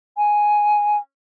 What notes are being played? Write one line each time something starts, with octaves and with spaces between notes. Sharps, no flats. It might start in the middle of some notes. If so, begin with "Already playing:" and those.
G#5